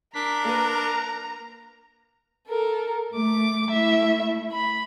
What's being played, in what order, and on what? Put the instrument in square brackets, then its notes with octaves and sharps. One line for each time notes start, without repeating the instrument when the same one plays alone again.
[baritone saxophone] D4 [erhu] A#4 [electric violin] B6
[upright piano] A#3 B4 [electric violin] A#5
[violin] A4 A#4
[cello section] A3 [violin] D6
[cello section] A3 E4 [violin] E5
[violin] B5